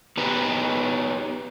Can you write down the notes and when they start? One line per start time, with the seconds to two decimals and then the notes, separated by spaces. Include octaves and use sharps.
0.17 B3 D#4 G4 B4